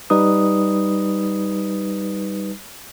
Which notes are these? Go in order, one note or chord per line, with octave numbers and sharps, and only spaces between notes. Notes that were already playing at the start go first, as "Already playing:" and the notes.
G3 D#4 B4 D#6